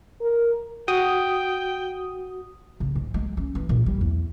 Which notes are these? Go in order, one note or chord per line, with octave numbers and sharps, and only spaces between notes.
A#4
F#4 G5 D#6
C#3
G#2
G#3
C#4
E3
A#2
G3
E2